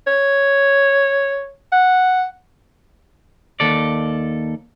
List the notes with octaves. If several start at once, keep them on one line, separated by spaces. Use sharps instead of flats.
C#5
F#5
D#2 A4 D5